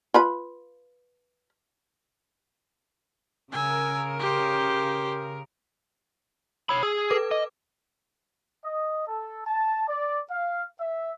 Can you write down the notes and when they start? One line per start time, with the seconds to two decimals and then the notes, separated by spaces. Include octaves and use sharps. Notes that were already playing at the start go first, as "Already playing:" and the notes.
0.14 F4 B4 B5
3.53 C#3 A#4 G#5 E6
4.20 G4 C5
6.69 C#5 B5 E6
6.83 G#4 E6
7.10 A4 B4 D6
7.31 D#5
8.64 D#5
9.08 A4
9.47 A5
9.89 D5
10.31 F5
10.81 E5